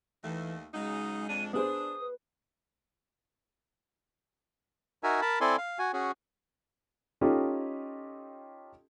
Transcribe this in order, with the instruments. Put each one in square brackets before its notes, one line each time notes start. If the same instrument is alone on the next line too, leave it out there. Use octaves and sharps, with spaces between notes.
[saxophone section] D#2 A3 [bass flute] E3
[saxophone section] C#3 F#3 D#4 [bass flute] G#3 [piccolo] D#6
[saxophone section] F2 D4 [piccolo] D#7
[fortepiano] B3 G#4 C5 [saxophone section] D4 [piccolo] D#6
[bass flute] B4
[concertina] D#4 F#4 A#4 E5 G#5
A#4 A5 B5
C4 E4 A4 D5 G#5 C6
F5
F#4 G#5
C#4 F#4 G#4
[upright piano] C#4 D#4 F4 G4 A4 D#5